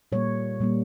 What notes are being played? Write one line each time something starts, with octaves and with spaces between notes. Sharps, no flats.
A#2 G3 A#3 C#5
A#2 G3 A#3